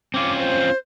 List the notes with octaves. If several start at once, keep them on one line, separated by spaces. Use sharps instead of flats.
C4 C#4 F4 D6
C5